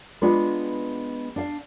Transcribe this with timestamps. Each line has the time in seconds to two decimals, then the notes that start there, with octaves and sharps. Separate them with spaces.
0.22 G#3 B3 D4 F4 G#4 B4
1.36 D4 F5